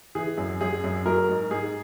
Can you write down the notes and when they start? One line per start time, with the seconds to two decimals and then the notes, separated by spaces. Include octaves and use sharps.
0.15 E3 G#4
0.38 F#2
0.61 F#2 G#4
0.84 F#2
1.05 F#3 A#4
1.29 G#2
1.51 G#2 G#4